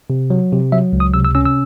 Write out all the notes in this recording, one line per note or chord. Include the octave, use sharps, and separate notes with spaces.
C3
F#3
C3
F#3 E5
C#2
D#6
C3 E6
E6
C#4 E6
E6